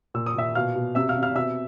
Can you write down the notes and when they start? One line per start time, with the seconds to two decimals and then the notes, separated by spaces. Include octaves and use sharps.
0.14 A#2 E6
0.26 D#6
0.35 A#2 E5 E6
0.55 B2 F5 F6
0.75 B2
0.95 C3 E5 E6
1.09 F5 F6
1.16 C3
1.22 F5 F6
1.35 B2 E5 E6